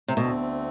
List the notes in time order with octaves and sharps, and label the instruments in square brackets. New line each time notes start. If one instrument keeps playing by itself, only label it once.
[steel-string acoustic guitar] C3
[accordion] D2 D3 A3 C4 [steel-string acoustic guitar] B2